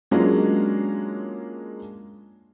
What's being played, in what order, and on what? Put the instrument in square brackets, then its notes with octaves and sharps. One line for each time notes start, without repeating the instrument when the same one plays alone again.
[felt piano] F#3 G#3 A#3 C#4 D4 F4